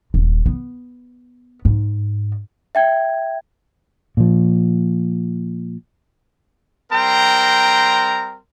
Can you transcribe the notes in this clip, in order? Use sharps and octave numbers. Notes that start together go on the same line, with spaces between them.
D#1
B3
G#2
E5 G5 G#6
A#2 F3
G3 C4 A#4 G5 A#5 C6